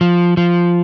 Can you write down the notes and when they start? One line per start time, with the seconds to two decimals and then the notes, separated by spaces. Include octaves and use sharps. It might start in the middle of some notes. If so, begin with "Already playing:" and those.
0.01 F3
0.37 F3